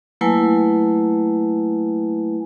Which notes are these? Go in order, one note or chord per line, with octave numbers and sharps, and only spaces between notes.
F#3 A3 A#3 E4 B4 G#5